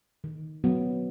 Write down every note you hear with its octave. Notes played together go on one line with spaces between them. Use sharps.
D#3
F#3 B3